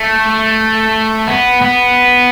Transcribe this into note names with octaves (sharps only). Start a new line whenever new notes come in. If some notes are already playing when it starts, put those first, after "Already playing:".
Already playing: A3
B3
B3